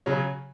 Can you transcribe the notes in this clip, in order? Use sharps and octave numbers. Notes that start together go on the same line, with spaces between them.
C#3 F#3 C#5